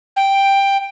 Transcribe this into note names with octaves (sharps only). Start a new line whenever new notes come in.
G5